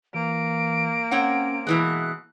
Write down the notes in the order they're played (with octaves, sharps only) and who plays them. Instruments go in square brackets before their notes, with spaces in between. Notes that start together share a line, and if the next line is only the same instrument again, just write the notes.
[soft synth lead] E3 [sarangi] A#3 [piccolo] D7
[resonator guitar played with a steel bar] C4 C#5 F#5 [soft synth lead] C#4
[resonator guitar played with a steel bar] B2 E3 G#3 [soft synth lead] F#6